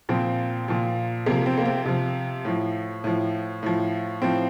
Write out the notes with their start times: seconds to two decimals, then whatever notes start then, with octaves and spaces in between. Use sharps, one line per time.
0.09 A#2 F3 C4
0.68 A#2 F3
1.26 C3 F3 A#3
1.46 C4
1.58 A#3
1.66 C4
1.85 C3 F3
2.45 A2 F3
3.04 A2 F3
3.63 A2 F3
4.22 A2 F3 C4